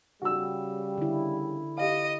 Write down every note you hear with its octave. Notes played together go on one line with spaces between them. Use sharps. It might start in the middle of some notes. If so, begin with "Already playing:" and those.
C#3 G3 F#4 E6
D3 E4
G4 D#5 F5